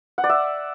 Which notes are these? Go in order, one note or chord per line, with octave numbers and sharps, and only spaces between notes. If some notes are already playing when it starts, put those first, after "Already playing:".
F#5
D5
E5